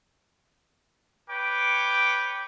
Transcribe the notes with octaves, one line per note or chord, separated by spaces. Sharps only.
B4 C#5 G5 D6